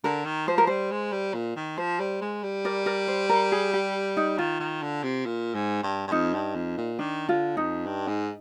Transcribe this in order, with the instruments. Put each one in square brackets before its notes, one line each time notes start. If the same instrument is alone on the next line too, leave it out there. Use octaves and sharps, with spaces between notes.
[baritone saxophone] D3 [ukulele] A#4
[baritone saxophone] D#3
[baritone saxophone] F3 [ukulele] C5
[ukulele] A#4
[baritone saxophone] G3 [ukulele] C5
[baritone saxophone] G#3
G3
A#2
D#3
[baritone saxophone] F3 [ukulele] C5
[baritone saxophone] G3
G#3
G3
[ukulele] A#4 D5
A#4 D5
C5
A#4
G#4
G4
D#4
[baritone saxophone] D#3 [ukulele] F4
[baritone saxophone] D#3
D3
C3
A#2
G#2
G2
G2
[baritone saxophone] F2 [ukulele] D#4
[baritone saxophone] G2
F2
A#2
[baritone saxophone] D#3 [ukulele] D4
[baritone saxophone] D3 [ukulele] F4
[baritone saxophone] F2 [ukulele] D#4
[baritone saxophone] G2
G#2